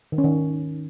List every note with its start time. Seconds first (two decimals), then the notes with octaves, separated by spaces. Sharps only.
0.12 D#3
0.18 C#4
0.24 D#3